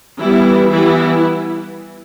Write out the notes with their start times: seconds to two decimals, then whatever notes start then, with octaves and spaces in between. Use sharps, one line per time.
0.21 E3 G3 B3 E4
0.70 E3 G3 B3 E4